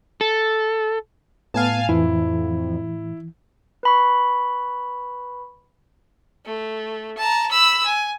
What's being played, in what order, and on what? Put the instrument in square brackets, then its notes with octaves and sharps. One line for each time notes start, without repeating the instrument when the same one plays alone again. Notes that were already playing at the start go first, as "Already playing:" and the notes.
[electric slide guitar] A4
[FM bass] A2 [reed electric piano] B3 [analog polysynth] F5 G#5 A5
[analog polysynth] F2 [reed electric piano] E3 [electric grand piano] E4
[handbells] B4 B5 C#6
[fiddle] A3
A5 A#5
B5 E6
G#5